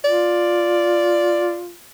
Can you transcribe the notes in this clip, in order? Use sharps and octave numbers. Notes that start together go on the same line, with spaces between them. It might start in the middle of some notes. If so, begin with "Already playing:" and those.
F4 D5